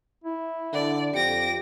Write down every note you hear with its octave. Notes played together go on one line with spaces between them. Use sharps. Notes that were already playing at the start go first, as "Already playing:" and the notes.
E4
D3 D5
F2 G4 A#6 D7